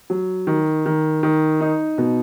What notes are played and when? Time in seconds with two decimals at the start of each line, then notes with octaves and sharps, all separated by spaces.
0.10 F#3
0.47 D#3
0.86 D#3
1.23 D#3
1.61 D#4
1.98 B2